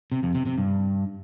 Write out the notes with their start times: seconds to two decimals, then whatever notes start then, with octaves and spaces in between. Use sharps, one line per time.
0.12 C3
0.23 F2
0.35 C3
0.46 C3
0.58 G2